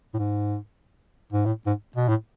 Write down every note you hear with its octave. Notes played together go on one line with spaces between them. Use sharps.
A2
G#2
G#2
A2
G#2
B2
A2